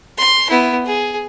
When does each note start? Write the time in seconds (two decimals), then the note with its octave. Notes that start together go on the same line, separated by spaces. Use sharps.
0.18 C6
0.50 B3 E4
0.86 G#4